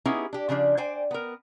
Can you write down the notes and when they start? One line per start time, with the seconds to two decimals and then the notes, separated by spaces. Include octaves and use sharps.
0.05 B3 C#4 D#4 E4 G4 G#4
0.33 D4 G4
0.49 C#3 F3 D4 D5
0.77 C5 D5 G5 G#5
1.11 B3 A#4